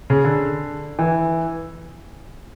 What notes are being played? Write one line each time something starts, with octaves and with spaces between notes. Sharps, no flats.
C#3
D3
E3